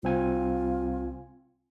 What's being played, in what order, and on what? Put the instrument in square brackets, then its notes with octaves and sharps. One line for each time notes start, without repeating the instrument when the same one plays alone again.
[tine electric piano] C2 C4 G#5 [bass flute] F4